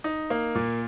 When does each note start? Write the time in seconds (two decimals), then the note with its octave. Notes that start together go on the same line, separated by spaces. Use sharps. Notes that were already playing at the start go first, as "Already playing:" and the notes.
0.04 D#4
0.30 A#3
0.55 A#2